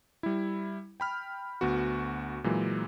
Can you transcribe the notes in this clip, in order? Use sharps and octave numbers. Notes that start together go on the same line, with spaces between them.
G3 E4
G5 B5 F6
D2 B3 F#4
A#2 E3 F#3 G#3